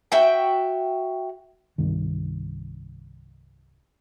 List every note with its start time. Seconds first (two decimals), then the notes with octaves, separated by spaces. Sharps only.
0.12 F#4 E5 G5
1.78 C2 G2 D#3